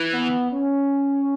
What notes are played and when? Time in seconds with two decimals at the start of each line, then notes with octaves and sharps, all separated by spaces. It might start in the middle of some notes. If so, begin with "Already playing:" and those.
Already playing: E3
0.12 B3
0.52 C#4